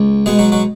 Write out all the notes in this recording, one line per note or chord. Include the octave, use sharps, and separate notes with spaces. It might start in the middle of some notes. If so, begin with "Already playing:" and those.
Already playing: C#2
B2 G#3 B3 G#4
F#3 F#4
F#3 F#4